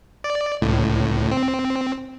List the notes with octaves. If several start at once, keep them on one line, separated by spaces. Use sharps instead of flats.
D5
C#2 A2
C4